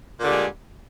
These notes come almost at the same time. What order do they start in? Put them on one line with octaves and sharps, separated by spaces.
A#2 D3 G3 G#3